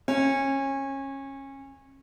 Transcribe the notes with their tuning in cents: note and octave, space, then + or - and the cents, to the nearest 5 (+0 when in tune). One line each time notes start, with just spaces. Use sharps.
C#4 -25